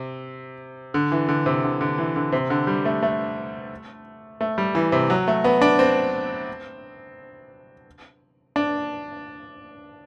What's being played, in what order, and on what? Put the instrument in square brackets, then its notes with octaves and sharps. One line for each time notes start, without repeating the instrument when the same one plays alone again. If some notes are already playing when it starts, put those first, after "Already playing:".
Already playing: [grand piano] C3
D3
E3
D3
C3
D3
D3
E3
D3
C3
D3
G3
A3
A3
A3
G3
E3
C3
F#3
A3
B3
D4
C4
D4